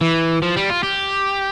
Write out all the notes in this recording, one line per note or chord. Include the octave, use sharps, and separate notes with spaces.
E3
F3
G3
F4
G4